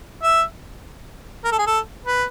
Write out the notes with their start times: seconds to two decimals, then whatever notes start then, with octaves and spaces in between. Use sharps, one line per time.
0.23 E5
1.44 A#4
1.52 A4
1.59 G#4
1.67 A4
2.05 B4